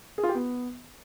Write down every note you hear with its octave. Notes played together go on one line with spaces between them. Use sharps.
G#4
F4
G4
B3